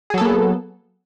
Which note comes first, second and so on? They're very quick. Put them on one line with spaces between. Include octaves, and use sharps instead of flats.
G#4 F#3 A4 A#3 B3